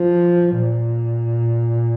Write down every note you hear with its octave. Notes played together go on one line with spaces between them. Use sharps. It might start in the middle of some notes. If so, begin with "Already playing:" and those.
Already playing: F3
A#2